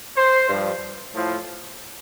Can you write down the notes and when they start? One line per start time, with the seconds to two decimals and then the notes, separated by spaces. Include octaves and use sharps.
0.17 C5
0.49 G2 F3
1.14 A2 F3